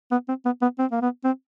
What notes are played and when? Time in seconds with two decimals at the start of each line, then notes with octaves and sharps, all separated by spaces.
0.12 B3
0.29 C4
0.45 B3
0.62 B3
0.79 C4
0.92 A#3
1.02 B3
1.24 C4